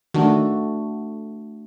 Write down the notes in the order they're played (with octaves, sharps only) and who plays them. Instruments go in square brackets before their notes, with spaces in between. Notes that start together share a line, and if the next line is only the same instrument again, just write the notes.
[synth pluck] D#3 [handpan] A3 D4 F#4